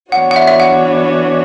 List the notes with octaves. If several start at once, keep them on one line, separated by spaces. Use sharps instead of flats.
E3 B3 D4 F#4 C#5 F#5
F#5
E5
E5
F#5